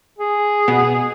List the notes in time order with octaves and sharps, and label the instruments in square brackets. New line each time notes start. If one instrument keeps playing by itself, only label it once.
[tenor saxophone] G#4
[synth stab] B2